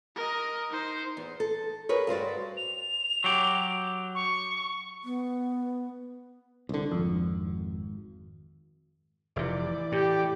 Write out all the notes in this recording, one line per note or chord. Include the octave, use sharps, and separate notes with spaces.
A#4 D#5
D#4 C5
E2
A4
G#4 A#4 B4 C#5
G2 F#4 C5 D5
F7
F#3 G4
C#6
B3
C2 D3
G#1 F2
F1 C3 E3 D5
A2 G4